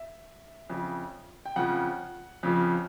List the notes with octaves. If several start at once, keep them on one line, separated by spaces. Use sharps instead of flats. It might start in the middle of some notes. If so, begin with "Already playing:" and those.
Already playing: E5
F2 C#3 F3
G5
F2 C#3 F3 F#5
F2 C#3 F3